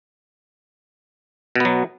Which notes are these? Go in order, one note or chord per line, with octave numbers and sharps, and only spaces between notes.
B2 F#3 B3